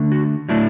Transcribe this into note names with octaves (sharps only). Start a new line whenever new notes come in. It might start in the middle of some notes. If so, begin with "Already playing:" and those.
Already playing: D3 A3 D4
F#4
A2 F#3 A3 D4 E4